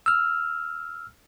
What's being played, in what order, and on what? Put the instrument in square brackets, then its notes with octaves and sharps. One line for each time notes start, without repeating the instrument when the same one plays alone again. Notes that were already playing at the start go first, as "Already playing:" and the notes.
[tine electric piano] E6 F6